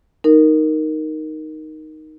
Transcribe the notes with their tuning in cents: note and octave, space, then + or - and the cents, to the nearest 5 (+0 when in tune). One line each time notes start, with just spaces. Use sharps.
D#4 +0 A#4 +0